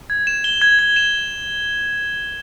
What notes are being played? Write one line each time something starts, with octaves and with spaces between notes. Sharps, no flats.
G#6
E7
G7
G#6
G#6
E7